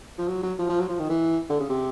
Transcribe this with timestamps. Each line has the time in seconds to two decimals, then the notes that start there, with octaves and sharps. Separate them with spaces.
0.18 F3
0.28 F#3
0.43 F#3
0.59 F3
0.69 F3
0.79 F#3
0.89 F3
0.99 D#3
1.09 E3
1.49 D3
1.60 C#3
1.69 C3